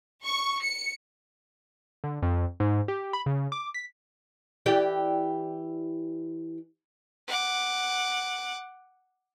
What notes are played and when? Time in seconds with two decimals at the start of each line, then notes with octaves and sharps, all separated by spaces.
0.24 C#6
0.63 C#7
2.04 D3
2.22 F2
2.60 G#2
2.88 G4
3.13 B5
3.26 C#3
3.52 D6
3.74 B6
4.66 E3 G4 D5
7.27 F#5 D6